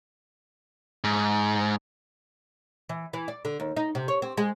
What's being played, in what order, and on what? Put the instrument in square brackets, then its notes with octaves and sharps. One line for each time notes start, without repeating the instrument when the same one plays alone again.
[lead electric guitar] G#2
[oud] E3
E3
D5
D3
D#2
D#4
C3
C#5
C4
G#3